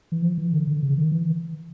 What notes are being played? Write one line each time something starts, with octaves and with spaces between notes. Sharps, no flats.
E3
F3
E3
D3
D3
C#3
D#3
E3